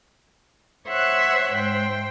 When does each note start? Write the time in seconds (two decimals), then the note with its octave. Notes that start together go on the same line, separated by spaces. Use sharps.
0.89 C5 C#5 E5 F#5 F#6
1.53 G#2 C5 G5